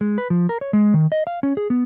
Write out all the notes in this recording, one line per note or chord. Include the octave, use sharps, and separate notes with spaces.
G#3
B4
F3
A#4
C#5
G#3
D#3
D#5
F5
C#4
G#4
B3